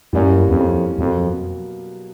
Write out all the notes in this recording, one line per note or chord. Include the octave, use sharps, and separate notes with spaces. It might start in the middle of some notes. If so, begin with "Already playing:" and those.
F#2 E3 G3 A#3 C#4
E2
F2
F2 B2 F#3 A#3